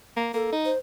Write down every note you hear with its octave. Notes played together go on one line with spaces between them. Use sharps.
A#3
A#3 A4
D#4
C5